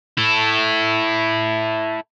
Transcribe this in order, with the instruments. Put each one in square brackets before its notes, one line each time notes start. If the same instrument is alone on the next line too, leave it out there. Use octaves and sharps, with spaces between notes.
[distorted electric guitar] E4 A4